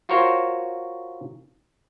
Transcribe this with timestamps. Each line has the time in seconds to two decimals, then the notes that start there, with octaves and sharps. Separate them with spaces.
0.09 F4 F#4 A#4 C5 C#5